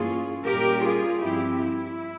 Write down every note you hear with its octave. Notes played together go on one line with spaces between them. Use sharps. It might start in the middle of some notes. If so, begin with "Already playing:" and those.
Already playing: G2 E3 A#3 C#4 F4 G#4
A#2 G3 C#4 G4 A#4
F4 G#4
G2 F3 C4 E4 G4
E4